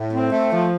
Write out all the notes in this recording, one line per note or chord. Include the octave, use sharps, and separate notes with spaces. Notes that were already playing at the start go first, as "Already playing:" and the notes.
Already playing: A2
C4
A3
F3